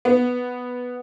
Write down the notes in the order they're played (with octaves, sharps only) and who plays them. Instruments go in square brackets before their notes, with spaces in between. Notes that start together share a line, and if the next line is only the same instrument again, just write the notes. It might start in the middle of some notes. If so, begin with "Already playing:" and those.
[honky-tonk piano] B3